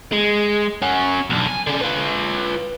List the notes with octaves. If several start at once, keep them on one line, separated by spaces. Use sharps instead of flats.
G#3
C#4 F#4
B1 D3
G#5
D3 C#4
F4 B4